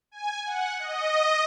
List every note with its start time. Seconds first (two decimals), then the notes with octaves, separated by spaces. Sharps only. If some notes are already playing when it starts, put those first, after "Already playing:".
0.11 G#5
0.46 F#5
0.79 D#5